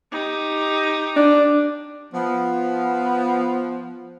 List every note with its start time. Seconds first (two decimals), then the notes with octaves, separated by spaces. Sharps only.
0.12 D#4 G4
1.16 D4
2.13 F3 B3